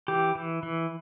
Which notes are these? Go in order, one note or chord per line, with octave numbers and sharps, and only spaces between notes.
E3 G4
E3
E3